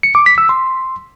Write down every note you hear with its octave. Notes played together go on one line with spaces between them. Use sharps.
C#7
D6
B6
E6
C6